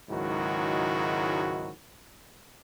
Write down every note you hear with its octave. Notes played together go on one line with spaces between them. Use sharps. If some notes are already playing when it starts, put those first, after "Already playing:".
C#2 G#2 D#3 F#3 E4 F#4